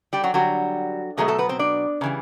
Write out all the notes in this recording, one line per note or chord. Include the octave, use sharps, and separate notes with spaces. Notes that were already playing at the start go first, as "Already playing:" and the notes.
G3 G4
F#3 F#4
D3 F#3 G3 F#4
B2 F#3 G#3 A3 G#4
A3 A4
B3 B4
C4 C5
D4 D5
C#3 E3 G3